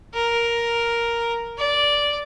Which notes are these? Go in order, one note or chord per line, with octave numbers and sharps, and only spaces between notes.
A#4
D5